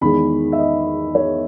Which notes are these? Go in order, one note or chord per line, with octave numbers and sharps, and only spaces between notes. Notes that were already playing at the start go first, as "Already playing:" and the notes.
E2 D#3 G#3 B5
E5
D#5
C#5